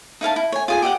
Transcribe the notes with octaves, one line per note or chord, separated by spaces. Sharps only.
D#4 E4 F5 A5
E4
C#5 G#5
F4 G#4 G#5
G4 D#5 E5 F#5